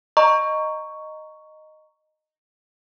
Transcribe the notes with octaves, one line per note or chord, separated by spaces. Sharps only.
D#5 A#5 C#6